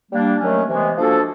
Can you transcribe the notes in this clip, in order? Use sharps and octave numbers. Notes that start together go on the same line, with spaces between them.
G3 A#3 D4
D#3 F#3 A3 C#4
C3 E3 G#3 B3
F3 A#3 D4 F#4 A4